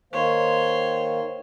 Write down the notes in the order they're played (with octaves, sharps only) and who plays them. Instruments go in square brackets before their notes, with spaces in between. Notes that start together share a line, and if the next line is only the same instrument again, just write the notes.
[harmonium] D#3 A#3 C5 [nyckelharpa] C#5 C6